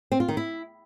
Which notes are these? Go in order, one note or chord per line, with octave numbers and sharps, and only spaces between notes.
C4
F4
D#3
E4